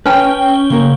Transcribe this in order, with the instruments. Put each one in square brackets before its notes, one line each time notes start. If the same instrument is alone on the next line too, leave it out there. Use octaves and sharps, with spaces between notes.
[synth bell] C#4 G5 [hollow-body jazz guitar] B4 C#5 A5
[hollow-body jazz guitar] C#3 A#3 A#4